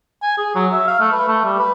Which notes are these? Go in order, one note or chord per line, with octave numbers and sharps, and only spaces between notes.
G#5
G#4
F#3
E5
F5
A3
B4
A3
G3
B4